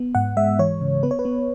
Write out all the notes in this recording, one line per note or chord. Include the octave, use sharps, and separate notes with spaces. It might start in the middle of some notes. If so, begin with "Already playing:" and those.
Already playing: B3
G#2 F#5
G#3 E5
E3 C#5
C#3
B3 B4
C#5
B4
B3